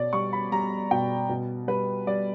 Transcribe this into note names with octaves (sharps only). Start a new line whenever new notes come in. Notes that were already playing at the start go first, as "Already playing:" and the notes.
Already playing: B2 C#5 D5
G3 C#6
B5
G3 A#5
B2 G5
B2
G3 B4
G3 D5